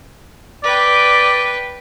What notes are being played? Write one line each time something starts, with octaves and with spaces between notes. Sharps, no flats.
B4 D5 G5